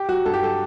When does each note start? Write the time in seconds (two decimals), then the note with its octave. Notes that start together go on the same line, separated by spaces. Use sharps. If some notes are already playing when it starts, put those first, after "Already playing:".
Already playing: G4
0.09 F#3 F#4
0.26 G2 A4
0.34 G4
0.43 F#3 A4